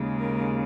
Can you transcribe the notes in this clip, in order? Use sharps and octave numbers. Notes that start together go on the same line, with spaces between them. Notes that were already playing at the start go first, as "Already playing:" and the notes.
Already playing: D#2 C#3 G#3
A#4